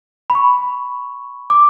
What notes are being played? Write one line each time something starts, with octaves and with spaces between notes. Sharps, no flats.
B5
C#6
D6